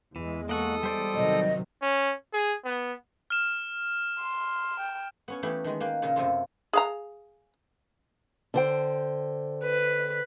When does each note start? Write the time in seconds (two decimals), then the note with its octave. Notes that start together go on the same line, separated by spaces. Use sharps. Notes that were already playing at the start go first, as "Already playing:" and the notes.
0.16 E2 E3 G#3
0.49 A#3 A4 F#5 C#6 D#6
0.83 G3 C5 D5
1.15 C3 D#3 F#3 D#5
1.82 C#4
2.33 G#4
2.65 B3
3.30 F6 E7
4.20 C6
4.80 G5
5.28 B3 C#4 C#5
5.43 E3 A3 B3 G4
5.64 D#3 G#3
5.80 A#3 B4 F5 G5
6.02 A#2 C#3 A#4
6.16 F#2 C3 A3 F4
6.73 G#4 F5 A#5
8.54 D3 C5 G5
9.64 B4